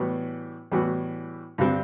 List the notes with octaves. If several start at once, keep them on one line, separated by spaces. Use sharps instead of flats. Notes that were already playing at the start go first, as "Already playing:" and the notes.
Already playing: A2 E3 G3 B3 F#4
A2 E3 G3 B3 F#4
G2 D3 G3 C4 G4